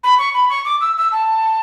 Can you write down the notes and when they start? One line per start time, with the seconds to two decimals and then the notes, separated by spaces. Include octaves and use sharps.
0.04 B5
0.19 C#6
0.34 B5
0.50 C#6
0.65 D6
0.81 E6
0.97 E6
1.12 A5